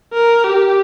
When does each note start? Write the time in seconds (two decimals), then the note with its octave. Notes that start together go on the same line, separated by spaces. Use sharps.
0.13 A#4
0.44 G4